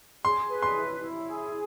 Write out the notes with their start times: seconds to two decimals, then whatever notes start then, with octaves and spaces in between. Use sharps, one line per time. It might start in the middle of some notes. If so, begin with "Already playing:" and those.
0.24 G#4 C6
0.49 B4
0.62 C6
0.74 E4
1.01 E4
1.26 G#4